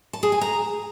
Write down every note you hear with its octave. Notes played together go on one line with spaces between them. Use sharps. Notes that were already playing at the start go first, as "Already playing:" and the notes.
A5
G#4
G#5
A#5